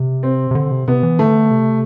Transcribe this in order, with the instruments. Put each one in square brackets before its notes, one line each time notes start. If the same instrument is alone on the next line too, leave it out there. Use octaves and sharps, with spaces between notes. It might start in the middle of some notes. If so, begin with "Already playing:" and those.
Already playing: [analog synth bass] C3
[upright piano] C4
[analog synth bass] C3
D3
C3
[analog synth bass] C3 [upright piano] B3
[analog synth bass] E3
[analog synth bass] D3 [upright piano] A3
[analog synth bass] C3